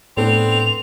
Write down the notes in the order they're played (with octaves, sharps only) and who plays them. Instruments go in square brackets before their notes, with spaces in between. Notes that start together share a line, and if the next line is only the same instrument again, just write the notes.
[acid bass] A2 [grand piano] B3 D4 A4 [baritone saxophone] C4 [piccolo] F7